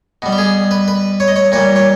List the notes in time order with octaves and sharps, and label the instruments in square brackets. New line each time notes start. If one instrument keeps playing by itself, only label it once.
[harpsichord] B2 G3
G4
G#4
B4
B4
C#5
D#5
C#5
A#2 G3 C#5
C#5